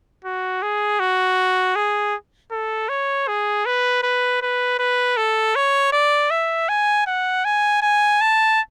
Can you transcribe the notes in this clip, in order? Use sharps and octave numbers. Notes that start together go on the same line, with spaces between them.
F#4
G#4
F#4
G#4
A4
C#5
G#4
B4
B4
B4
B4
A4
C#5
D5
E5
G#5
F#5
G#5
G#5
A5